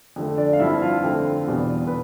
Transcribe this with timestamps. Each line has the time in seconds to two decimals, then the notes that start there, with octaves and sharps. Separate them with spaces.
0.16 F2 D3 A3
0.37 D4 D5
0.53 F5
0.60 G2 F3 C4 E4 E5
0.82 F4 F5
1.04 F2 D3 A3 C4
1.47 E2 B2 G3 B3
1.87 B4